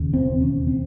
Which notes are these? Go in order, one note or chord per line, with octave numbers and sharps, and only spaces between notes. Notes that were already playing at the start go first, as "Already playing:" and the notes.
Already playing: E1 D#2 C#3
C4
C#4
C4